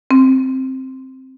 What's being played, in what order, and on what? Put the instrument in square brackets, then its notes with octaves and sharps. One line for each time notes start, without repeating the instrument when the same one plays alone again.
[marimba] C4